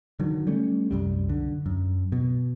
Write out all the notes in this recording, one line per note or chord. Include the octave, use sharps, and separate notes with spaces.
D3 D#3 F#3
G3 A3 C#4
C2 F#2 G3
D3
F#2
B2